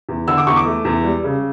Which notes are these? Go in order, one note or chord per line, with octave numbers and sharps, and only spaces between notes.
E2
D3 E6
D6
E2 C#6
D6
A3
E2
G3
C#3